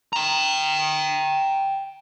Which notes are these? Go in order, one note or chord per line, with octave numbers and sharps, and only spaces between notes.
G5 A#5